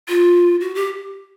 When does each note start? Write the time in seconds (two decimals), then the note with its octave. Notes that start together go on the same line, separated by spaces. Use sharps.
0.09 F4
0.61 F#4
0.75 G4